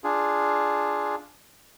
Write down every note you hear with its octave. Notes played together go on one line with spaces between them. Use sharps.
D4 F4 G#4